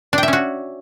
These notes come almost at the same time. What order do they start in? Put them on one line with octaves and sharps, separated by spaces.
D4 G5 E5 C#4 F#4